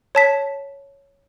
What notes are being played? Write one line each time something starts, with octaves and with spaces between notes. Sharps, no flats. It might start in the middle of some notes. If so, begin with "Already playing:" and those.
C#5 A5 B6